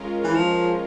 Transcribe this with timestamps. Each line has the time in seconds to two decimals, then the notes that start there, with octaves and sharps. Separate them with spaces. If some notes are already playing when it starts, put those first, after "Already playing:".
Already playing: G#3 C#4 F4 A#4
0.24 E3
0.35 F3